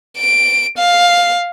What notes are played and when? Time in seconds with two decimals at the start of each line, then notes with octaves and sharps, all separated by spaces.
0.18 D7
0.78 F5